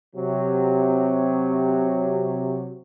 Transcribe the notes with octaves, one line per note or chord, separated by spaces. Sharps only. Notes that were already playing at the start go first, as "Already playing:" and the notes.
C3 F#3